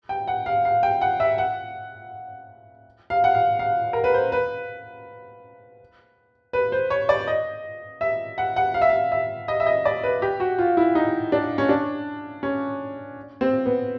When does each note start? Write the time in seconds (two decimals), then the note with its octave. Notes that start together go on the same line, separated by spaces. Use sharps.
0.09 G5
0.28 F#5
0.46 F5
0.65 F5
0.83 G5
1.01 F#5
1.20 E5
1.38 F#5
3.10 F5
3.24 F#5
3.35 F5
3.59 F5
3.93 A#4
4.04 B4
4.14 C5
4.32 B4
6.53 B4
6.72 C5
6.90 C#5
7.09 D5
7.27 D#5
8.01 E5
8.38 F#5
8.56 F#5
8.74 F5
8.82 E5
8.89 F5
9.12 E5
9.48 D#5
9.60 E5
9.66 D#5
9.85 D5
10.04 B4
10.22 G4
10.40 F#4
10.59 F4
10.77 E4
10.95 D#4
11.32 D4
11.58 C#4
11.69 D4
12.43 C#4
13.41 C4
13.66 B3